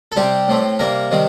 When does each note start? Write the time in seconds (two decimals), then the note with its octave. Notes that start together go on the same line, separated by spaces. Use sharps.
0.12 A4
0.16 C3 G3 C4 G4
0.48 A2 A3 C4
0.79 C3 G3 A#3 A#4
1.11 C3 D#3 G3 C4